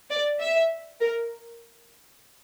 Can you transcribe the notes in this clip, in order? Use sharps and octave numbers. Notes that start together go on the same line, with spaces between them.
D5
E5
A#4